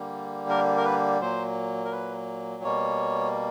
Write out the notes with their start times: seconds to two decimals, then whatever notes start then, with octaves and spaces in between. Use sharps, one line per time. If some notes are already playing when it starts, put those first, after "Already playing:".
Already playing: D3 G3 A#3
0.49 A#4
0.78 A#4
0.85 B4
1.21 A#2 F#3 A#3 C5
1.85 A#4
1.92 B4
2.63 B2 G3 A#3 C#5